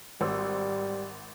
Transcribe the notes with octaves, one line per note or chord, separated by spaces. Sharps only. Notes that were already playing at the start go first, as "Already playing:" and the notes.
G#1 G3 C5 E6